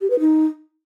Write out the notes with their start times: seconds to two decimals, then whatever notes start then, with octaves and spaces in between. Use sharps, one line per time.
0.01 G4
0.10 B4
0.20 D#4